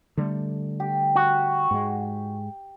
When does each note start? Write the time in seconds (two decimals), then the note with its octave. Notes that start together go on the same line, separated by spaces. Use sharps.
0.17 D3 G3 A3
0.80 G4
1.16 F#4
1.71 G#2 G#3